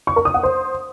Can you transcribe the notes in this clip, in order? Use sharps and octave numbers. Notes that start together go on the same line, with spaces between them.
C#6
A#4
D#6
F#5
C5